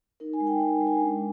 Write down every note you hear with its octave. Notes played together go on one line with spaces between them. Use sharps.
D#4 A#4
G#5
G#3
G5
D#4
G#3
G#5
D4